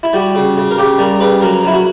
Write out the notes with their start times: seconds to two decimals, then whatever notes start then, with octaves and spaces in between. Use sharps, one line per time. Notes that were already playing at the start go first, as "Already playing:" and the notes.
0.03 E4
0.13 G3 F#4
0.35 C#3
0.57 C#3
0.71 A#4
0.78 C#3 G4
0.99 G3 A#4
1.20 C#3 B4
1.41 F#3 A#4
1.63 F#3 E4
1.74 F#4